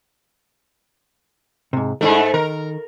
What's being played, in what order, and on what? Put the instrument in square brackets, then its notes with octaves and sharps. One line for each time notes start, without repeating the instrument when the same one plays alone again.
[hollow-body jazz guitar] G#2 C3
[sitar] G#2 A3 [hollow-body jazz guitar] G#3 D4 E4
[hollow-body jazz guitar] D#3 [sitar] A#4